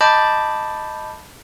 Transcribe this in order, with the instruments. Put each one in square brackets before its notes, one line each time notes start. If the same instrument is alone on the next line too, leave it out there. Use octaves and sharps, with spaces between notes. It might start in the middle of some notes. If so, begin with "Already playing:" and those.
[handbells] D#5 A5 B5 D6 G6 A6